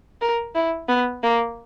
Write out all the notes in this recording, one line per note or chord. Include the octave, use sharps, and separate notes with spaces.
A#4
E4
B3
A#3